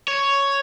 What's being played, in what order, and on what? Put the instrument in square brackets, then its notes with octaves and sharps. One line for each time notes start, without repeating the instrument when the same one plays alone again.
[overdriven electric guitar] C#5